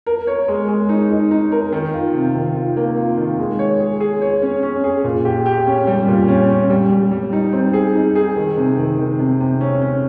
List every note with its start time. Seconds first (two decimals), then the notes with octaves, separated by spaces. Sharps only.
0.06 A#4
0.27 C#5
0.48 G#3
0.68 G#3
0.89 D#4
1.10 D#4
1.31 D#4
1.52 A#4
1.72 D#3
1.93 F4
2.14 C3
2.35 D#3
2.55 F4
2.76 A#3
2.97 F4
3.17 D#3
3.39 G#3
3.59 C#5
3.80 G#4
4.00 G#4
4.22 C#5
4.42 C#4
4.63 C#4
4.84 G#4
5.04 A#2
5.25 G4
5.46 G4
5.67 C#4
5.87 G3
6.08 A#2
6.28 C#4
6.50 C#4
6.70 G3
6.91 G3
7.11 G3
7.33 D#4
7.53 C4
7.73 G#4
7.95 D#4
8.15 G#4
8.36 D#3
8.57 C3
8.78 D#3
8.98 D#3
9.19 C3
9.40 C3
9.61 C#4
9.81 C#4